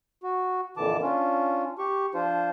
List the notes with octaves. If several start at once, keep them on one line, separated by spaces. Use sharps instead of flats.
F#4
F2 A#2 D3 E3 A5 D6
C#4 D4 F4
G4 C#6
F3 D4 F4 C5